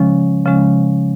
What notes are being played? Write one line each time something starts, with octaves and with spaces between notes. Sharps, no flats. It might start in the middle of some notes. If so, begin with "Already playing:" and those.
Already playing: C#3 F3 G#3 C#4
C#3 F3 G#3 C#4